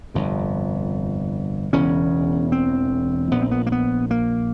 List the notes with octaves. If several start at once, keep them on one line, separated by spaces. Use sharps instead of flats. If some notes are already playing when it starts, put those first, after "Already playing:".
G1 F2 C3
E1 E2 C#3 C#4
C4
A#1 A#2 B3
C4
B3
A#3
B3
A#3